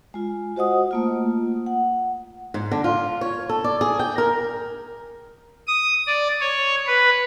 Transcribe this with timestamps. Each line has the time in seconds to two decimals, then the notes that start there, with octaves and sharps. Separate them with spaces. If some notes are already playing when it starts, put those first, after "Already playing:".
0.14 G#3 F4
0.56 F#4 C5 D#5 F#5 D#6
0.91 A3 A#3 F4
1.66 F#5
2.54 G#2
2.71 D3
2.84 F4
3.21 C#5
3.49 A4
3.64 D5
3.81 G#4
3.99 G5
4.18 A#4
5.68 D#6
6.07 D5
6.41 C#5
6.87 B4